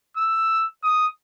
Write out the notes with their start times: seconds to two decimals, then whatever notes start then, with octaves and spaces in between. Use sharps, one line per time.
0.17 E6
0.84 D#6